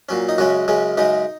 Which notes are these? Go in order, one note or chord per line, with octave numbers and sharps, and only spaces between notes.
A#2 F#3 C#4
D#4
F#2 C#3 G#3 C#4 F#4
F#2 C#3 G#3 C#4
F#2 C#3 G#3 D#4